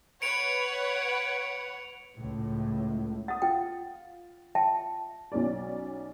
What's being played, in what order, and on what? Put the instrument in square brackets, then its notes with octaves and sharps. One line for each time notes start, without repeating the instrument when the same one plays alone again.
[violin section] B4 C#5 F#5 [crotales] C#7 D7 F7
[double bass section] C#2 A2
[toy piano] F#5 [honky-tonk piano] D#6 A6
[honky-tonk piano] F4 [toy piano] G5
[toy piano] E5 G5 A5
[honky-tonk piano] B1 C#4 D5